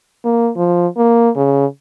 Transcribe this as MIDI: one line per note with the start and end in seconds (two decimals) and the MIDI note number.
0.24 0.50 58
0.56 0.87 53
0.97 1.30 58
1.36 1.66 49